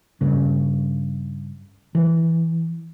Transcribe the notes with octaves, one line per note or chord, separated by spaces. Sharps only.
G2 C#3
E3